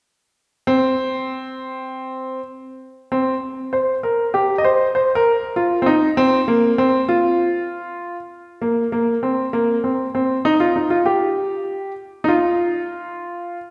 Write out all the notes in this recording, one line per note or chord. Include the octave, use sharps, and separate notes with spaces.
C4
C4
C5
A#4
G4
D#5
C5
C5
A#4
F4
C4
D#4
C4
A#3
C4
F4
A#3
A#3
C4
A#3
C4
C4
D#4
F4
D#4
F4
G4
D#4
F4